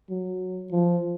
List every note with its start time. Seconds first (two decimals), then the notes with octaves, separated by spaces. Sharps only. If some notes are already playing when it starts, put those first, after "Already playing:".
0.09 F#3
0.71 F3